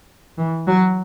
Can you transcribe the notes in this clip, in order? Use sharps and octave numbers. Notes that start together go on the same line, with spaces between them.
E3
F#3